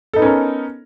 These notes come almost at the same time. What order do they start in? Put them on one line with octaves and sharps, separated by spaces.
A4 D#4 B3 C#4 A#4